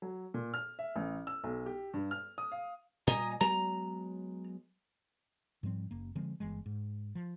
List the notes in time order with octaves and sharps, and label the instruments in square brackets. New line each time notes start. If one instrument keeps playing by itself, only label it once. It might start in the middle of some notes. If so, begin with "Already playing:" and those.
[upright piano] F#3
A#2
F6
E5
A1
E6
B1
G4
G2
F6
D#6
F5
[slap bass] A#2 G3 [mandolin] D#5 G#5 A#5
[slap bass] F#3 G#3 B3 [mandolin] A#5
[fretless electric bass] G#2 F3 G3 C4
F#1 A#3
D3 F3 G#3 C4
G1 E3 G#3
G#2
F3